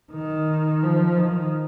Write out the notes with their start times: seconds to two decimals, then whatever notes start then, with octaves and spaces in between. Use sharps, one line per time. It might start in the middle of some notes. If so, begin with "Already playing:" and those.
0.12 D#3
0.83 F3
1.18 D#3